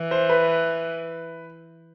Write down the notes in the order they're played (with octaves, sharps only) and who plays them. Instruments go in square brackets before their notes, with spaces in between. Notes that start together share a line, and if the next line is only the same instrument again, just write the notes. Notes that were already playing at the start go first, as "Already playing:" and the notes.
Already playing: [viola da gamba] E3
[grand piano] C5
B4